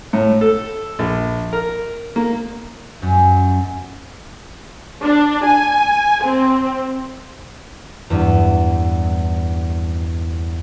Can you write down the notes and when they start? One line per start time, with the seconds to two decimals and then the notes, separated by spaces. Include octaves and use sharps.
0.13 A2
0.41 A4
0.99 A#1
1.53 A#4
2.16 A#3
3.02 F#2
5.02 D4
5.45 G#5
6.23 C4
8.10 E2 G2